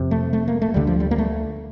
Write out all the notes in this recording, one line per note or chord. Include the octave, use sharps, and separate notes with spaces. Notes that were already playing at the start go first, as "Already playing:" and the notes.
Already playing: F2 C3
A3
A3
A#3
A3
D2 D3 G3
F3
G3
A#3
A3